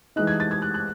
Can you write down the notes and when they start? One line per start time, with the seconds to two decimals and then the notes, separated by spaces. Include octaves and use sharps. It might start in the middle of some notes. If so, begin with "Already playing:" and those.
0.16 E3 G#3 D#4 F#6
0.27 G#6
0.40 A6
0.51 G#6
0.62 F#6
0.74 F#6